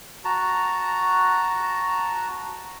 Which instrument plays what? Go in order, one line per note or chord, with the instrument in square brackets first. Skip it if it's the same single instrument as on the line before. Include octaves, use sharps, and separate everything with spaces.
[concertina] F#4 A5 A#5